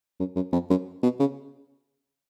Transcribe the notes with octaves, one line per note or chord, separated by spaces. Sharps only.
F#2
F#2
F2
F#2
B2
C#3